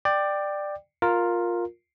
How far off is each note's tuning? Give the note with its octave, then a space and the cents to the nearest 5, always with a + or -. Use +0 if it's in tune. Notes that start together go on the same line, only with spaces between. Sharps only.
D5 +15 G5 +0
F4 +10 A#4 +0